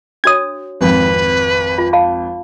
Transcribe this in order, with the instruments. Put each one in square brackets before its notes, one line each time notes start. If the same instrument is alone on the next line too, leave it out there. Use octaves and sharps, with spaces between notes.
[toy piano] D4 F#4 C#5 [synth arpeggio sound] D#6 G#6
[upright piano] G#1 F2 [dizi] B4
[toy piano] F4
F5 A5 B5